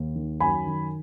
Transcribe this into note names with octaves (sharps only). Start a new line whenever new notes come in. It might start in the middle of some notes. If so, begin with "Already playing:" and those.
Already playing: D#2
D#3
F#2 G#5 B5
D#3